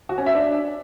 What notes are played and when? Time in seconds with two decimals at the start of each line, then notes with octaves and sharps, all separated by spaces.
0.09 F#4
0.18 C#4
0.26 E5
0.35 D4